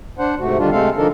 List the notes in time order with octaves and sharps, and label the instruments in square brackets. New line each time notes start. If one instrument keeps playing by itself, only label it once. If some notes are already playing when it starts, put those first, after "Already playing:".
[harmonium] D4 C5 F#5
G#2 C3 A3 F#4
D3 D#3 G3 D4 F4
C3 G#3 A3 C4 A4 F5
D3 F3 D4 D#4 A4 A#4